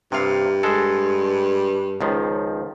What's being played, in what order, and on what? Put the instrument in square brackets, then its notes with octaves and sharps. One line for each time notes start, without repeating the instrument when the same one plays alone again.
[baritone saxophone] G2 [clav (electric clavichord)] C3 F5
[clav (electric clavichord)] G#3 A4
C#2 D#3 F3